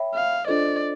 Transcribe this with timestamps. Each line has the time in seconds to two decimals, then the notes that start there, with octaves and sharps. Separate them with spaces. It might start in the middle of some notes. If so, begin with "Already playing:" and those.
Already playing: C#5 E5 G5 B5
0.15 F5
0.46 D4 F4 A4 C5 D5 D#5